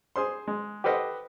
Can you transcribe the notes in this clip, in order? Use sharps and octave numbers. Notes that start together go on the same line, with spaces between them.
G#4 C5 C6
G#3
G4 A4 B4 C5 D#5 F#5